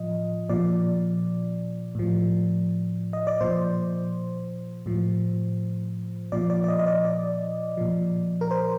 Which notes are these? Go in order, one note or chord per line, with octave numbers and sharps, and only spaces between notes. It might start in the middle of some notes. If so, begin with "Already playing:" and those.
Already playing: A2 F3 D#5
A#2 F3 D5
A2 F3
D#5
D5
A#2 F3 C5
A2 F3
A#2 F3 D5
D5
D5
D#5
D#5
D5
D5
A#2 F3
A#4
C5